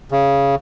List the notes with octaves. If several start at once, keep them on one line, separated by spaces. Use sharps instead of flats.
C#3